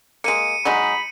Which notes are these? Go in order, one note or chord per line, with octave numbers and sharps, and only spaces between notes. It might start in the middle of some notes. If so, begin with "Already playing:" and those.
G#3 A#3 C#7 D#7
F#3 G#3 D#4 B5